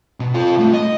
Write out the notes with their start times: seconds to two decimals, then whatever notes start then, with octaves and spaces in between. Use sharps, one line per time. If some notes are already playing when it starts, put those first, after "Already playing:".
0.20 B2
0.34 F4 A4
0.57 C2 A3
0.73 D#5